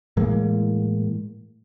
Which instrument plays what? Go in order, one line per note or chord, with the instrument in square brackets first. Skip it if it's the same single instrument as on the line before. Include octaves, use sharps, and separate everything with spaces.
[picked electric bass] A2 E3 G#3 A#3